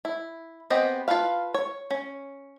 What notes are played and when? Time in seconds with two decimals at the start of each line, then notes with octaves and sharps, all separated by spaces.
0.05 E4
0.70 B3 C4 G4 G#4 D#5
1.08 F4 G#4 A4 B4 F5
1.54 C#5
1.91 C#4